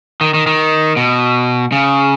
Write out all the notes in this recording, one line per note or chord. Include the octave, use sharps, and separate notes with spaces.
D#3
D#3
D#3
B2
C#3